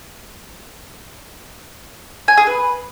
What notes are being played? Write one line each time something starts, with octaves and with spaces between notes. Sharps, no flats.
G#5
G#4
B4